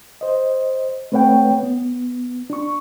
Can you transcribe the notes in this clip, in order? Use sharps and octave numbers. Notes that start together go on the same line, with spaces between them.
C5 D#5
A3 C4 B4 C#5 F#5 G5
B3
D4 C#6